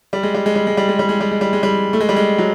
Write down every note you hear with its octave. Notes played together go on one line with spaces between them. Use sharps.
G3
G#3
G3
G#3
G3
G#3
G3
G#3
G3
G#3
G3
G#3
G3
G#3
G3
A3
G#3
G3
G#3
F#3